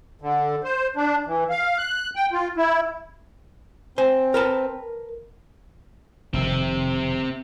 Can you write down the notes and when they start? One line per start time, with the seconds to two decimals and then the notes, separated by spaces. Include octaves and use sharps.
0.21 D3
0.64 C5
0.96 D4
1.26 E3
1.50 F5
1.78 F#6
2.16 G5
2.32 F4
2.57 E4
3.98 C4 C5 G#5
4.34 A#4 B4 A5
6.33 F1 D#3 C4 E5